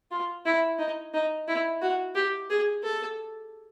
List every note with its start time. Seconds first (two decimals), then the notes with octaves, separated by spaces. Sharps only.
0.11 F4
0.46 E4
0.79 D#4
1.14 D#4
1.48 E4
1.82 F#4
2.15 G4
2.50 G#4
2.84 A4